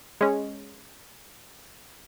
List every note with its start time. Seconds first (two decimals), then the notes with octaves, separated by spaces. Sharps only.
0.21 G#3 C#4